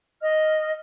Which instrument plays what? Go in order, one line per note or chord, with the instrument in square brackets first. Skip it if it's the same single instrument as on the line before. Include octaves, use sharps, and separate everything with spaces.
[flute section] D#5 F6